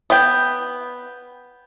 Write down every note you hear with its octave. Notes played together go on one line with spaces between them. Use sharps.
B3 G5